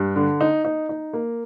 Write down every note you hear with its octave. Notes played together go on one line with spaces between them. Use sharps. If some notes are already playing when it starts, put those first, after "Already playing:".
Already playing: G2
D3
D#4
D#4
D#4
A#3